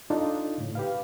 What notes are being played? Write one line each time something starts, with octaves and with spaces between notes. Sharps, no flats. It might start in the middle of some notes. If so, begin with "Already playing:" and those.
D4 D#4 F4 A4 D#5
A2 C#3
G4 B4 F5